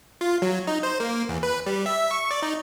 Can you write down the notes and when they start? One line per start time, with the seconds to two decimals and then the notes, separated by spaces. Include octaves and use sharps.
0.21 F4
0.42 F#3
0.67 D#4
0.83 C5
1.00 A#3
1.29 E2
1.43 B4
1.66 G3
1.86 E5
2.11 C#6
2.31 D5
2.42 D#4